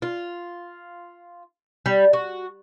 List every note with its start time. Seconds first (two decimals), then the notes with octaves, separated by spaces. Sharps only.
0.02 F4
1.86 G3
2.13 F#4